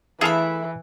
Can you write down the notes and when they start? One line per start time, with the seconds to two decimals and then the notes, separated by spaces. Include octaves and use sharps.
0.21 E3 A3 E4 G#4 A4 E5 F5 B5